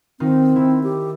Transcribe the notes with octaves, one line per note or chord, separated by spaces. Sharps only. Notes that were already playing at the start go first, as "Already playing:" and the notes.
D#3 C4 D#4 F4
D#3 E4
G4